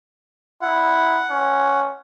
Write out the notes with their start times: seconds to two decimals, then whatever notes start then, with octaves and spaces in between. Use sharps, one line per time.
0.62 E4 F#5
1.30 C#4